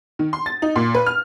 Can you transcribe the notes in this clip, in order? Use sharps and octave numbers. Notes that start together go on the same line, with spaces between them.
D#3
C6
A6
D#4
A#2
B4
F6